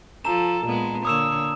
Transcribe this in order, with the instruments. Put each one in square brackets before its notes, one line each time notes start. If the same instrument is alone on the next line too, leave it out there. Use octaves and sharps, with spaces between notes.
[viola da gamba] F3 A4 [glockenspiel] A5 A#5 E7
[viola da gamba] A#2 G#3 B3
[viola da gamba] D3 A#3 C#5 [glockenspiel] D#6 E6 E7